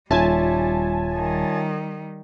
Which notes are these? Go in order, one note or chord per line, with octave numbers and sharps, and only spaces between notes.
D#1 G3 F4 C#5 E5 G#5 A5
D#3 G3